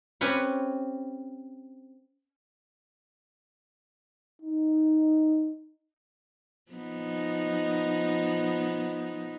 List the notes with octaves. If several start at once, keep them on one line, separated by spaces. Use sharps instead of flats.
C4 C#4 G4 B4 C#5
D#4
F3 B3 D#4